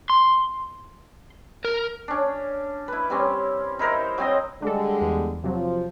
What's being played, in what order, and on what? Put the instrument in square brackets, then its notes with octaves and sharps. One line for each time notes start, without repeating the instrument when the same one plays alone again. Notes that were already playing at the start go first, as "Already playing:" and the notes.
[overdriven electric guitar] C6
A#4
[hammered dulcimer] C#4 D4
E4 B4
G3 C4 C#4
D#4 E4 A#4 C5
F#3 C4 D#5
[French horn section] D3 G3 G#3 [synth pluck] D4 A4
[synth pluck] E2
[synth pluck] C3 F#3 [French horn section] F3